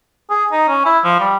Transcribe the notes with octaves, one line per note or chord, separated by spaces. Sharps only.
G#4
D#4
C#4
E4
F3
G3